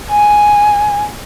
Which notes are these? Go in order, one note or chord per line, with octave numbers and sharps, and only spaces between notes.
G#5